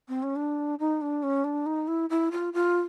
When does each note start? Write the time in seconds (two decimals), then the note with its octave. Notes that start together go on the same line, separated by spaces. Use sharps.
0.08 C4
0.23 C#4
0.36 D4
0.79 D#4
1.01 D4
1.23 C#4
1.44 D4
1.66 D#4
1.87 E4
2.10 E4
2.31 F4
2.53 F4